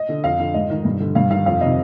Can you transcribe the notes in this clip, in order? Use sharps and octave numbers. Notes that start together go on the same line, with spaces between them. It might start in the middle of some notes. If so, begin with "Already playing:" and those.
Already playing: D#5
D3
F2 F5
D3
G#2 D#5
D#3
G2
D3
G2 F5
D#3 F5
F2 F5
C3 D#3 D#5